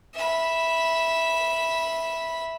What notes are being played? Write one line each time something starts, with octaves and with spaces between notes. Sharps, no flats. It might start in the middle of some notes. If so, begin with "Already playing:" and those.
E5 B5